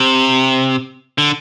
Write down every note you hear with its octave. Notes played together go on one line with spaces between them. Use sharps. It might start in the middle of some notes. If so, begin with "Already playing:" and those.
Already playing: C3
D3